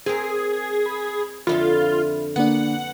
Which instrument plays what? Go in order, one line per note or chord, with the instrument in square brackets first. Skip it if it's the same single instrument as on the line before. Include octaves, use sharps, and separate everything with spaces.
[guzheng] C4 A#4 [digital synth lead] G#4
[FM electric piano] B5
[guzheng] F2 D3 A4 [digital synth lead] F4 [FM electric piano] E5 B5
[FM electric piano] D3 A#3 D4 [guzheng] B3 [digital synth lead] F#5